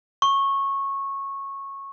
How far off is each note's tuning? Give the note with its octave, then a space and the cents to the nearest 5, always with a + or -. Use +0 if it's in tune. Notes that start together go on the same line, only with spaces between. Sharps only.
C#6 -15